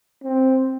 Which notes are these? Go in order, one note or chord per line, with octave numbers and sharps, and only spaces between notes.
C4